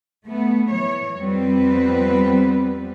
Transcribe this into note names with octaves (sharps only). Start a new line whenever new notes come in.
A3 B3
E3 C#5
F2 G3 B3 C4 B4